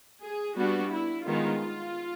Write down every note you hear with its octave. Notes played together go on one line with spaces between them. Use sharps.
G#4
G3 B3 D4 F#4
E4
D#3 G#3 B3 D#4 F4